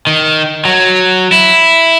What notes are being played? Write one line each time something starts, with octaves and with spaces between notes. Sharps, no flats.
D#3
F#3
E4